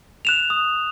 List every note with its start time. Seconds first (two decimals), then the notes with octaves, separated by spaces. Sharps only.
0.25 F#6 E7 F7
0.50 D#6